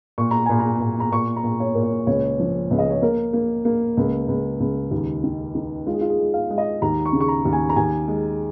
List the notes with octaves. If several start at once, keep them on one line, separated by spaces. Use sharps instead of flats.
A#2 C#6
A#5
A#2 G#5
A#5
A#2
A#5
A#2 C#6
A#5
A#2
C#5
A#2 A#4
C#5
C#2 C#5
F3
C#2
D#5
C#5
A#3 A#4
A#3
A#3
C#2
C#2
C#2
D#2
D#3
D#3
G#3 F4
G#4
F4
G#4
G#3
F5
G#3
D#5
D#2 A#5
C#6
C#3
C#6
A#5
D#2
G#5
A#5
D#2 G#5
G#3